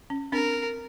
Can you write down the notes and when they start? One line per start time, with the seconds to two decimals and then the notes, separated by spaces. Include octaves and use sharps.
0.10 C#4
0.32 C4 D4 A#4